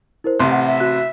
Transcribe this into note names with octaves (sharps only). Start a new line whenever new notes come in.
E4 A#4 C5
A1 C3 C6
F#5
E5
F#4 F#6